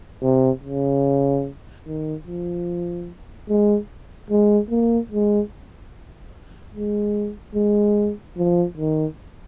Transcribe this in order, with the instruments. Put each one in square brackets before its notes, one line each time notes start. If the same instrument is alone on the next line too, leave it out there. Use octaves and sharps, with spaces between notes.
[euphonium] C3
C#3
D#3
F3
G#3
G#3
A#3
G#3
G#3
G#3
F3
D#3